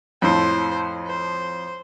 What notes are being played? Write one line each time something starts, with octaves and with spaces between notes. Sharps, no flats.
F2 A2 C5
C5